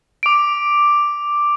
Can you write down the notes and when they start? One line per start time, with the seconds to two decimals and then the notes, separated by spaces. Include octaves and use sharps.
0.23 D6 D7